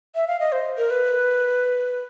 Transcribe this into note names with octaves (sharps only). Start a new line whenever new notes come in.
E5
F5
D#5
C5
A#4
B4